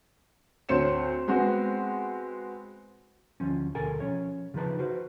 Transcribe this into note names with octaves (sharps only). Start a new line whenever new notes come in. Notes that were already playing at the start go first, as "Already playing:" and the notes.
D2 C4 C#5 C#7 E7
G#3 B3 C4 F#4
D2 F3 C#4
D2 B2 A4 A#4 G#5
F3 C#4 C#5
C#3 F3 D#4 B4 A5
F#4 B4 C5